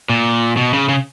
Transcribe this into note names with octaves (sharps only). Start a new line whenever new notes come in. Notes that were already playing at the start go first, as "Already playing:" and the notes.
A#2
B2
C#3
C#3